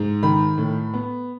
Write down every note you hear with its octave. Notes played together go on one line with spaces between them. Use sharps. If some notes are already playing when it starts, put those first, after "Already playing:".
Already playing: G#2
D#3 B5
A2
B3